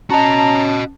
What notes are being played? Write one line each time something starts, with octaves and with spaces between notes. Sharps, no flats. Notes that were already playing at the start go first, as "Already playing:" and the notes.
C#4 F#4 D#5 A5 A#5